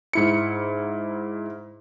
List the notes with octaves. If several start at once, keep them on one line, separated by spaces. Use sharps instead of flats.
G#2 E4 C#7